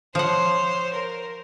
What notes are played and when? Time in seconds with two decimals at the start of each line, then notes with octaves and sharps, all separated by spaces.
0.15 F3 C5 C#5 F#5
0.94 A#4